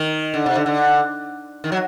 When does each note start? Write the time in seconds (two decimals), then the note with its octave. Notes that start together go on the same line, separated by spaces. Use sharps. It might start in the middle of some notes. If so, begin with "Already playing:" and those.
Already playing: D#3
0.34 D3
0.46 C3
0.55 D3
0.66 D3
1.64 D#3
1.72 F#3